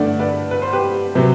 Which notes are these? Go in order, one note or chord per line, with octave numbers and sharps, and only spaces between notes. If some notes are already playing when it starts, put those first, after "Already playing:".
Already playing: G2 D3 A3 D5 F#5
B4 D5
B4
C5
G4 B4
C3 F#3 B3